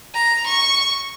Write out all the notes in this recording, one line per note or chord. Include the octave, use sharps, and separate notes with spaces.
A#5
C#6